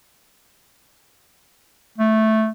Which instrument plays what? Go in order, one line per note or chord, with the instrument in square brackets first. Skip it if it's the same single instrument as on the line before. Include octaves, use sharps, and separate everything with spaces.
[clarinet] A3